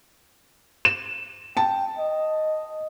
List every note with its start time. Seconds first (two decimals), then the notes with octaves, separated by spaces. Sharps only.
0.85 E7
1.57 G5 A5
1.98 D#5